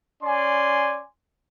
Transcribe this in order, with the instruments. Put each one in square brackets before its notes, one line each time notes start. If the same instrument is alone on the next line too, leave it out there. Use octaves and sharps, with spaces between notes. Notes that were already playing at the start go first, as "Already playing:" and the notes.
[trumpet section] C#4 D5 G#5 C6